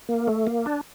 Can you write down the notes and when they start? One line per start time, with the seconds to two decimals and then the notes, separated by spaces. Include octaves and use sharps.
0.09 A#3
0.28 A3
0.47 A#3
0.66 D4